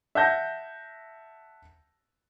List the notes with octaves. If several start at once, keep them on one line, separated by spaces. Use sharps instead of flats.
E5 F#5 A5 G6 A#6